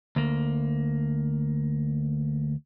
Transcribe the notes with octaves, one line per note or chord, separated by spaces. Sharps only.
D2 A#3